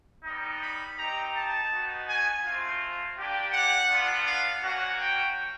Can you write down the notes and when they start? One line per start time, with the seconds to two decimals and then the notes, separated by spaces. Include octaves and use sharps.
0.24 G3 B3 D#4
0.61 B5
0.96 C4 D#4 G4 A#5
1.34 A5
1.69 B3 D#4 F#4
2.07 G#5
2.43 A3 C4 F4
3.17 A#3 D4 G4
3.52 F#5
3.89 B3 D4 F4
4.25 F5
4.63 A#3 C#4 F#4 F#5
5.00 G5